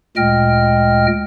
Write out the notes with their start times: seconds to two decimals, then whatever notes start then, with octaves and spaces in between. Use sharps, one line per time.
0.17 D2 A#2 G#3 D#5 G5 F6